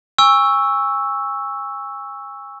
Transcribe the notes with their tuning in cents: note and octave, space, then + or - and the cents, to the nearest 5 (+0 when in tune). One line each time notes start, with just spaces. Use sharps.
G#5 -35 C#6 +0 E6 +0